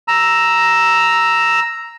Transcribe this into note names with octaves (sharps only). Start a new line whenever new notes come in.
A#5 E6